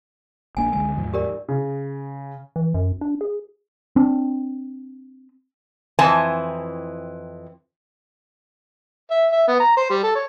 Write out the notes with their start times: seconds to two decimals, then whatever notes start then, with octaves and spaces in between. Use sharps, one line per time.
0.57 A#1 A#3 D4 G#5
0.73 C#2 D3 G#3 G#5
0.97 D#2 G#2 F3
1.13 G4 A#4 D5
1.48 C#3
2.56 E3
2.74 F#2
3.01 D4
3.21 G#4
3.96 C4 D4
5.99 F2 E3 C4 G#5 A5
9.11 E5
9.32 E5
9.48 B3
9.60 A#5
9.77 C5
9.90 G3
10.03 A4
10.15 C#5